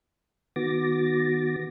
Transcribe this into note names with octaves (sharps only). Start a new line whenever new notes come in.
D#3 B3 F#4 D6 A6 A#6